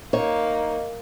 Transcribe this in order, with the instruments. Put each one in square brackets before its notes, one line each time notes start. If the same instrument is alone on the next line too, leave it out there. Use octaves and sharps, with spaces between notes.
[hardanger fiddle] A#3 [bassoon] D#4 [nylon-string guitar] C#5